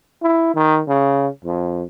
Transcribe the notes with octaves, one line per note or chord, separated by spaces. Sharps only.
E4
D#3
C#3
F2